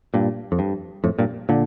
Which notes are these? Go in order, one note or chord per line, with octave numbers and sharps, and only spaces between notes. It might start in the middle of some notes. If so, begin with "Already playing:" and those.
G2 A#2
F2
G2
F2 A2
G2 A#2
A#2 D3